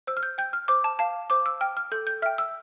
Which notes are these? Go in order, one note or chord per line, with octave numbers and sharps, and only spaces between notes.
C5 E6
F6
G6
G5 G6
F6
C5 D6
A5
F5 A5
C5 D6
E6
G5 F6
F6
A4 G6
G6
E5 G5 F6
E6